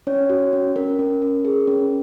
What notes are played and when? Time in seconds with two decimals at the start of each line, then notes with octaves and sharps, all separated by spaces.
0.07 C#4 C#5
0.30 F#4
0.53 C#4
0.76 C#4 A#4
0.99 C#4
1.22 C#4
1.45 G#4
1.67 C#4